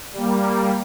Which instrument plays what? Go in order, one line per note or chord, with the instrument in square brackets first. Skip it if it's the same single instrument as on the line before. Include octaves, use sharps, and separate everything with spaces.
[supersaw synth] G3 A#3